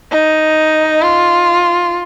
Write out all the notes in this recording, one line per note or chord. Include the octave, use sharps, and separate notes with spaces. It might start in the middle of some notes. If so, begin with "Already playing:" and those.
D#4
F4